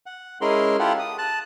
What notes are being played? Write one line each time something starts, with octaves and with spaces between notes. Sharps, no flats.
F#5
G#3 C#4 E4 G#4 A#4 C6
E4 F4 G4 A4 F#5
D#6
A5 F#6